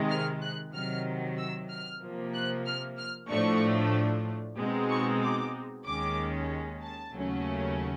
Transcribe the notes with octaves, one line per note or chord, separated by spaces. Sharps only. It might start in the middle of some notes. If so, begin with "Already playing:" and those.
Already playing: C3 D#3 G#3
F6
F#6
C3 D#3 F#3 F6
E6
F6
C3 F3 A#3
F#6
F6
F6
A2 F3 A3 D4 C#6
B2 G#3 C4 D#4
C#6
D6
D#2 D#3 G#3 C#4 D6
A5
D#2 C#3 F#3 A3 C#4